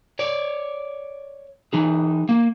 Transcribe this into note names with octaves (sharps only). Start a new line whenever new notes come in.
C#5 D5
E3 D#4 G#4
A#3